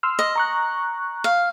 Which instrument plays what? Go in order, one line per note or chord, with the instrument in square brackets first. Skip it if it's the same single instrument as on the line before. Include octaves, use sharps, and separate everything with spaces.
[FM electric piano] C6 E6 F6
[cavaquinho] D#5
[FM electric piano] A#5 C#6 F#6
[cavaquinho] F5